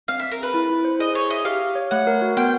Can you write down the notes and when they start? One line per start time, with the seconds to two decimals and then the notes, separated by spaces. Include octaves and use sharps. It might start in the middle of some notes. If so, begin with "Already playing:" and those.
0.08 C4 F5
0.19 C4 E5
0.31 A#4
0.39 G#4 B4
0.54 E4
0.70 E4
0.85 C5
0.99 G#4 D#5
1.15 G#4 C#5
1.30 D#5 E5
1.45 G4 F5
1.61 G4
1.75 C#5
1.91 A3 F#5
2.07 A#4
2.22 F#4
2.37 B3 G5